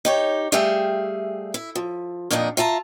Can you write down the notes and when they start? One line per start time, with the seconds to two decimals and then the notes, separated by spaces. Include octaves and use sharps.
0.05 D#4 G4 C#5
0.52 G3 A3 G4 G#4 E5 F5
1.54 E4
1.75 F3
2.31 F2 A#2 D#3 D4 D#4
2.57 F4 E5 A5 A#5